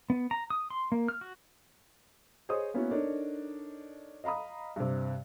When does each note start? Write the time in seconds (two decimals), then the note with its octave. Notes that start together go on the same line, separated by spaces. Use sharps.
0.10 B3
0.31 A#5
0.50 D#6
0.70 C6
0.92 A#3
1.08 F6
1.21 F#4
2.49 G#4 C5 C#5 D#5 D#6
2.74 A#3 B3 C#4 E4 F#4
2.91 D4 D#4 A4 A#4 C#5
4.24 D#5 F5 A#5 B5 D#6
4.76 G2 C3